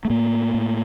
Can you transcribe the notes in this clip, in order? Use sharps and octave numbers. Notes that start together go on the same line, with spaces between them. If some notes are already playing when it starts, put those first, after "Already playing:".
A3
A2 A#3
A2